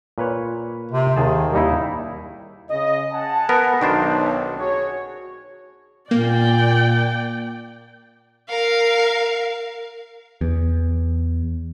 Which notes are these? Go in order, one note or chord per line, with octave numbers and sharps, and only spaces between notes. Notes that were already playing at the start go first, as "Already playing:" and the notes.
A#2 B4 C#5
C3
D#2 D#3 G#4 A5
D#2 G3 D#4 E4
C#3 D#5
F#5 G#5 A5
B3 A#4
B1 D#3 D4 C5
F#4 G#4 C#5
A#2 A#3 D5 G5
A#4 F5
E2